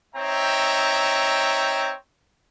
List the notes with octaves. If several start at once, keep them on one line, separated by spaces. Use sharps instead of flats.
C4 D#4 C#5 E5 G5 A#5